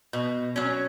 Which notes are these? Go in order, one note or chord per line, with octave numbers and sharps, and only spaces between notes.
B2
F#3 C#4